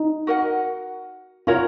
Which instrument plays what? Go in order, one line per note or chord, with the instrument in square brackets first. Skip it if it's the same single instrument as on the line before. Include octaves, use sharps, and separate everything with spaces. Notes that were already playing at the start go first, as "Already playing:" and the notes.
Already playing: [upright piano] D#4
[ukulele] F#4 A#4 D#5 F#5
[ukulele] C#4 F#4 A#4 C#5 [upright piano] F4